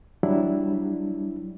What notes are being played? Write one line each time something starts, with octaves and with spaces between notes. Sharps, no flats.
F#3 G3 D4 E4